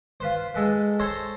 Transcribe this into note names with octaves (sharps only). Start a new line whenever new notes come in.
F4 B4 C5
G#3 A4 B4
A4 C5 C#5 A#5